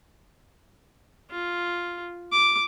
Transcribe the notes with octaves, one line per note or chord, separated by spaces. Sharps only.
F4
D6